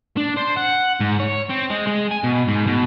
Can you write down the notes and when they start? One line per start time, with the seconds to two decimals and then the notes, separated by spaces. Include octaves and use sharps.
0.17 D4
0.36 C5
0.56 F#5
1.00 G#2
1.20 C#5
1.50 C4
1.70 G#3
1.87 G#3
2.11 G#5
2.23 B2
2.48 G#2
2.67 B2